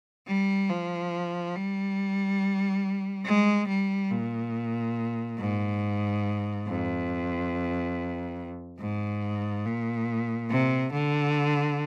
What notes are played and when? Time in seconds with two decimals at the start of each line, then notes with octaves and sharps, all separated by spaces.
0.27 G3
0.70 F3
1.56 G3
3.25 G#3
3.68 G3
4.11 A#2
5.39 G#2
6.67 F2
8.80 G#2
9.65 A#2
10.50 C3
10.93 D3